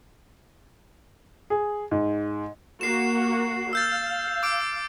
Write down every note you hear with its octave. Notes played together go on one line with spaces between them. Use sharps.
G#4
G#2
A#3 F#4 C7 E7
F5 E6 G6 A6
D6 E6 D7